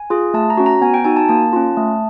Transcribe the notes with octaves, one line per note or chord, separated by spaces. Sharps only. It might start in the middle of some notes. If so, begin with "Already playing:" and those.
Already playing: G#5
F4 G#4
A3 A5
A#5
C#4 F#4
A#5
B3 G#5
G5
D#4 F#4 G#5
A5
A#3 A5
C#4 F4
A3